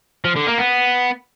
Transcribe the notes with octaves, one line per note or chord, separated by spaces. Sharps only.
F3
D3
A#3
B3